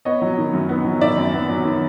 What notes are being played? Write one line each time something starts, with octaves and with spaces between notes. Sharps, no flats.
B3 C#5 D#5
F#3
D#3
F#2
B3
F#3
D#3 D5 E5
F#2
B3
F#3
D#3